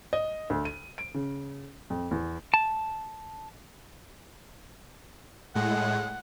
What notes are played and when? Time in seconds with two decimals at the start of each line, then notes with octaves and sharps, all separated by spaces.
0.13 D#5
0.50 D2
0.65 D#7
0.98 D7
1.14 C#3
1.90 F2
2.11 E2
2.54 A5
5.55 A2 G#3 F#5